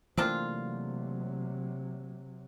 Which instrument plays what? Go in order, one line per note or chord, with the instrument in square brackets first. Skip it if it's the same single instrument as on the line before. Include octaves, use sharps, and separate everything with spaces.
[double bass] C3 F#3 [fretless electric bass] E3 A3 A#3 [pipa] C4 D4 F4